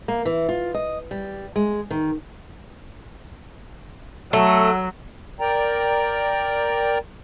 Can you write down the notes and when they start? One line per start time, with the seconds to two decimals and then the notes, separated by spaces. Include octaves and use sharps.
0.08 A#3
0.25 E3
0.49 F4
0.74 D#5
1.11 G3
1.56 G#3
1.91 D#3
4.33 F#3 A3
5.40 A#4 D5 G5 A#5